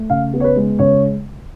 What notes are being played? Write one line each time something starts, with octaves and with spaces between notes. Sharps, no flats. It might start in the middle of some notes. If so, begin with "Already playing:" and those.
Already playing: A3
C#3 F5
B3
C#5
B4
G#3
C#3 C#5